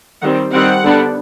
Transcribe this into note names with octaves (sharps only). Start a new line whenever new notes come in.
D#3 G3 C4 F#5
D#3 G3 C4 F#5
D3 G3 B3 D4